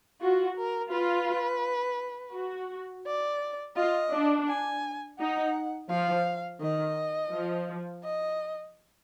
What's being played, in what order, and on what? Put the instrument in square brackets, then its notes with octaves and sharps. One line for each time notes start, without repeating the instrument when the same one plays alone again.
[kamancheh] F4 [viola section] F#4
[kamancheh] A#4
[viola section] F4 [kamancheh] B4
[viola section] F#4
[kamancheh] D5
[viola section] F4 [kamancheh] D#5
[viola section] D4
[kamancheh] G#5
[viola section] D#4 [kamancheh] F#5
[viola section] F3 [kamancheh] F5
[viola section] D#3 [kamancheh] D#5
[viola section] F3
[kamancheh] D#5